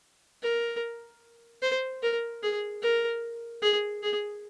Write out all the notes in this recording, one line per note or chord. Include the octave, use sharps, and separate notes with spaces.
A#4
C5
A#4
G#4
A#4
G#4
G#4